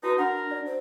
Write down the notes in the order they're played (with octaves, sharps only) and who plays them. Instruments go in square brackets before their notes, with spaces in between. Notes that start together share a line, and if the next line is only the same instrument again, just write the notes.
[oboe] D#4 [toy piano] E4 F#4 A5 [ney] B4
[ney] D4 [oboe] A#4 [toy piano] F#5 B5
[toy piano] D5
[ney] C5